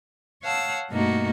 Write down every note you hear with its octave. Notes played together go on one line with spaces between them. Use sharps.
C#5 F5 F#5 A5 E6
G2 B2 A3 A#3 D#4 F#4